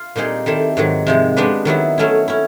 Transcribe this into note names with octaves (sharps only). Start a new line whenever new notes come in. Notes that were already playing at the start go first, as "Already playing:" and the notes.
Already playing: F4
A#2 G3 C4 D#4 G#4
D#3 G3 C4 E4 A4
G#2 D#3 F#3
C3 F3 G#3
G#3 B3 D4 G4 B4
D#3 F#3 B3 E4
F#3 A3 C#4 E4
C#4 E4